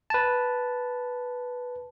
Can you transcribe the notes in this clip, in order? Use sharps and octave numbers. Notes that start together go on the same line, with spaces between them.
B4 A5